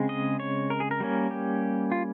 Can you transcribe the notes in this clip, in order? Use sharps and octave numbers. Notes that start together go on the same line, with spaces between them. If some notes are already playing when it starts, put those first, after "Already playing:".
Already playing: C#3 G#3 C4
D#5
C#5
A#4
G#4
A#4
G3 A#3 C#4
G4
F4